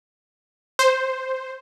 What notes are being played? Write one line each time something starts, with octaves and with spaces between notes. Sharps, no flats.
C5